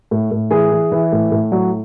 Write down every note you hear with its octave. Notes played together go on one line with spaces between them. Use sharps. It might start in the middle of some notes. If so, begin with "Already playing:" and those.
A2
A2
E3 G#4
E3
E3
A2
A2
F#3